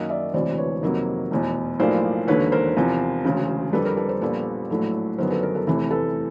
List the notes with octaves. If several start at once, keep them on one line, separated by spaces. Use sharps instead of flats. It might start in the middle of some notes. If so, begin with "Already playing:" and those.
Already playing: F#2 D#3 F#3 A#3 D#5 F5
D5 E5
E1 D2 C3 E3 C5 D5
B4 C#5
F2 C3 D#3 F#3 A#3
F1 E2 B2
B1 A2 F3 A#3 C5 D5
E1 D#2 D3 B4 C#5
A#4 C5
E2 C3 F3
E1 D2 C#3
F2 D3 G3 A4 B4
A#4
A4 B4
A#4 C5
A#1 A#2 G3 B3 A4 B4
A#1 A2 F#3 A3
G1 F#2 D#3 F#3 B3 A#4 C5
A4 B4
A#4
A4 B4
F1 E2 C3 E3 A3
A4 B4